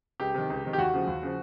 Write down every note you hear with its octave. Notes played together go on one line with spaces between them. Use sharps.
C#2 G4
C3 D#3
C#2
C3 D#3
G4
D#2 F#4
C#3 F3
D#2
C#3 F3